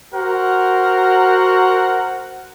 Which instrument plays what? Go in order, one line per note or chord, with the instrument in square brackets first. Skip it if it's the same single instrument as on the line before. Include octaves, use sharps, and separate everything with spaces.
[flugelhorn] F#4 [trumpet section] A#4 C5 F#5